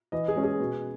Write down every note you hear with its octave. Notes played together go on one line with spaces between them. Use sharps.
E3 D#5
G#4
G#3 C#4
G#4
B2